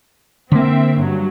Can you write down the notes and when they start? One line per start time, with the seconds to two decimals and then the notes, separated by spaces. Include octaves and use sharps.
0.52 D3 A#3 C4 E5
1.00 G2 F#3